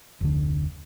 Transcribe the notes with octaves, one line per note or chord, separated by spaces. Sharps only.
F1 D2 D3